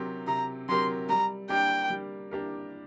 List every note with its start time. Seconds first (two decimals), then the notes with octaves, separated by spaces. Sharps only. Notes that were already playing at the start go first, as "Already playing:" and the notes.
Already playing: C3 F#3 C4 G4 A#4
0.27 C3 A#5
0.68 F#3 C4 G4 A#4 C6
1.09 G3 A#5
1.49 A#3 D4 G4 A#4 G5
1.90 G3
2.31 A#3 D4 G4 A#4